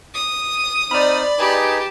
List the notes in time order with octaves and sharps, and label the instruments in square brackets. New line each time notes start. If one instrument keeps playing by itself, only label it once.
[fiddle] D#6
[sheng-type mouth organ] C4 D#4 F6 [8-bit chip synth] D5 B5
[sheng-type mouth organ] D#4 G#4 B4 [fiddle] G4 A5